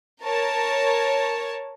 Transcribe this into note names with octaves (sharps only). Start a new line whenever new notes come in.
A#4 C#5 A5